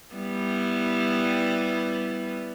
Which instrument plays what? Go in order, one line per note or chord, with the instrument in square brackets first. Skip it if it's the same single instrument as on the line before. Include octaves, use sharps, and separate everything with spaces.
[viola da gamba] G3 B3 E4